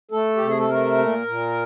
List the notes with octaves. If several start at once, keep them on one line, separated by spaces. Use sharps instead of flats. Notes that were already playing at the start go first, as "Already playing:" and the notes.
A3 A4
C3 G4
G#4
A4
A3 A#4
A#2
A#2